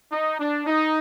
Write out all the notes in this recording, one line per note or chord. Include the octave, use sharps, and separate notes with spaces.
D#4
D4
D#4